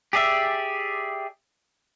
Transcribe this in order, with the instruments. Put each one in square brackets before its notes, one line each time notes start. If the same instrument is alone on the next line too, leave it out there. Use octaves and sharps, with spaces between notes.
[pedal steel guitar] G4 G#4 D5 E5